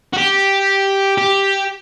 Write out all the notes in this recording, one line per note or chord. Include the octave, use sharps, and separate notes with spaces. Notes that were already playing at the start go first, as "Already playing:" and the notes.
F#4
G4
G4